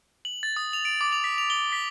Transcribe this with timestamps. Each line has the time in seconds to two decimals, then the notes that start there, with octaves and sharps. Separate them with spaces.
0.25 F#7
0.43 A6
0.57 D#6
0.73 F7
0.85 D7
1.01 D6
1.12 F7
1.24 B6
1.38 F7
1.50 G7
1.72 B6